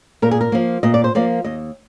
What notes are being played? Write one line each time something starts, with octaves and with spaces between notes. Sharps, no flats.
A#2 A#4
G#4
A#4
F3 A#3
A#2 D#5
D5
C5
F3 A#3 D5
D#2 D#5